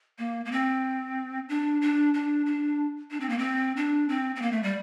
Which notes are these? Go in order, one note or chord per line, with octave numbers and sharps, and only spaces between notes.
A#3
A#3
C4
D4
D4
D4
D4
D4
C4
A#3
C4
D4
C4
C4
A#3
A3
G3